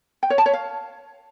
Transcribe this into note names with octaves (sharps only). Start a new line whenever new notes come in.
G5
C#5
A5
C#5
F5